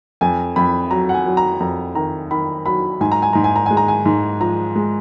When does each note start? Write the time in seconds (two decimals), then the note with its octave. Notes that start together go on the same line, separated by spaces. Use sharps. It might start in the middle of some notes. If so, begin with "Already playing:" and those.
0.21 F2 G#5
0.56 F2 B5
0.91 F#3 A#5
1.09 F#5
1.14 G#5
1.26 F#3
1.37 A#5
1.60 F2 A#5
1.95 D#3 A#5
2.31 D#3 B5
2.66 F#3 B5
3.01 G#2 G#5
3.12 A#5
3.22 G#5
3.33 G#2 A#5
3.44 G#5
3.56 A#5
3.66 G#3 G#5
3.77 A#5
3.88 G#5
4.06 G#2
4.41 F3 A#5
4.75 G#3